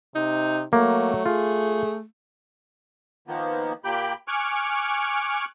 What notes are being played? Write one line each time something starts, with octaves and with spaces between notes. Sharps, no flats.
C3 D#4
F#3 A3 A#3
F4 G#4
D#3 F3 A#3 B3
A#2 A#3 G4 G5 B5 G6
G#5 C#6 D6 F6 F#6